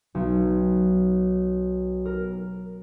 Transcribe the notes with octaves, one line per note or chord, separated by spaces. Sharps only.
B1
A#4